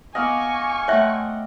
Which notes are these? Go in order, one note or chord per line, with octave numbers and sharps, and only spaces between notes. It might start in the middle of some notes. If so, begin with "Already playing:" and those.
B3 D#5 F5 F#5 G#5 C#6 D6
A3 C#5 E5 F#5 G5 C6 F6